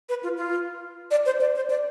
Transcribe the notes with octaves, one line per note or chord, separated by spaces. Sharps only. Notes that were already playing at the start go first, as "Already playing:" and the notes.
B4
F4
F4
D5
C5
D5
C5
D5